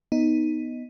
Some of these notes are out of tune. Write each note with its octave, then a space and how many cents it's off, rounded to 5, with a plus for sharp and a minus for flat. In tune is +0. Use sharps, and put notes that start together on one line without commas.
B3 +0 D#4 +0